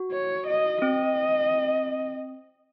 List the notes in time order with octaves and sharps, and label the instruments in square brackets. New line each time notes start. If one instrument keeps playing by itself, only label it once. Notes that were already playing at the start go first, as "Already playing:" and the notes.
Already playing: [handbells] F#4
[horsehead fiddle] C#5
D#5
[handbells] C4 [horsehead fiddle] D#5